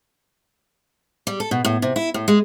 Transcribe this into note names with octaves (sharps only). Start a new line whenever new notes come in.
G3
A4
B2
A2
C3
E4
A2
G#3